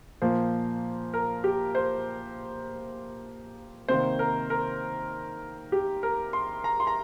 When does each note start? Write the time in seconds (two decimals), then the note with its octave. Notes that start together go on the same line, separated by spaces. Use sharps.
0.22 A#2 F3 A#3 C5
1.14 A#4
1.44 G4
1.75 C5
3.88 C3 D#3 A#3 C5
4.19 A#4
4.50 A#4
5.72 G4
6.03 A#4
6.33 C6
6.64 A#5
6.80 C6
6.87 A#5